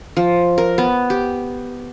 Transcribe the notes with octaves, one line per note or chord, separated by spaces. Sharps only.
F3
A#4
B3
G4